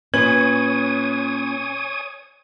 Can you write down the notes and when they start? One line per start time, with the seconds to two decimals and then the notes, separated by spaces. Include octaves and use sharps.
0.14 A#2 C#4 B4 C#5 G#5 D#6 G#6 F#7